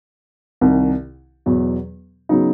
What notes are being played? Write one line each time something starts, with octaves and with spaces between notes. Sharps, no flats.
C2 C3 D#3
E2 B2 F#3
C#3 F#3 B3 D#4